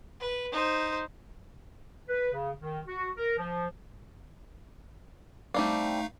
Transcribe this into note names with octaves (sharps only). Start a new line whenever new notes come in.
B4
D#4 C5
B4
C#3
D#3
F#4
A#4
F3
G3 A3 C4 D4 D#4 F5